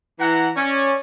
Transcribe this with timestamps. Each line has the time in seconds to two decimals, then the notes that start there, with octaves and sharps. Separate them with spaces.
0.19 E3 F#5 A#5
0.56 C#4 C#5 D5